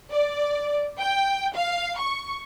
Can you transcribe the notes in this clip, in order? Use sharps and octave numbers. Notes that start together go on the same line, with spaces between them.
D5
G5
F5
C#6